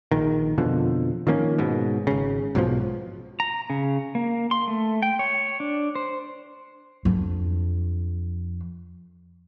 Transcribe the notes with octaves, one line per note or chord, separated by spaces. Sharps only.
A#1 D#3
F2 B2 D3 F3
D#3 F3 A#3 C#4
G#2 B2
G#1 C#3
B1 G#2 B2 F3
A#5
C#3
A#3
C6
A3
G5
C#5
D4
C5
F2 D4